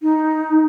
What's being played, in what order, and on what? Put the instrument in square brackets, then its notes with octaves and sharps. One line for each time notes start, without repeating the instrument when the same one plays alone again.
[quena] D#4